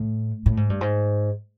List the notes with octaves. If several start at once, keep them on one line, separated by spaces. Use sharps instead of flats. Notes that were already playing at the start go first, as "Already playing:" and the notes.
Already playing: A2
A2
G#2
G2
G#2